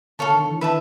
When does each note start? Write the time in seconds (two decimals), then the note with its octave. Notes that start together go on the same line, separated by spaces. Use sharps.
0.19 D3 A4 C#5 F5 A5
0.34 D#3
0.47 E3
0.61 D#3 B4 E5 A5